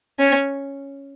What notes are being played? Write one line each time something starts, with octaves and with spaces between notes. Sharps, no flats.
C#4